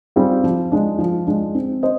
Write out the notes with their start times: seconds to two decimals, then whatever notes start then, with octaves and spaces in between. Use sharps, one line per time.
0.16 G3 C4 F4 G#4
0.44 F3
0.72 G#3 D4
0.99 F3
1.27 G#3 D4
1.55 C4
1.83 C5 D#5